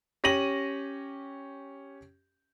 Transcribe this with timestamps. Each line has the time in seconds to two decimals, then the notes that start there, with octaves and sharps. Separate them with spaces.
0.24 C#4 G4 A#6 D#7 F#7